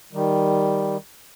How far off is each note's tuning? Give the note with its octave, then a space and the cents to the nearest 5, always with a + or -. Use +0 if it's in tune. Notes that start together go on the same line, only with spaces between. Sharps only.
D#3 +0 G3 +0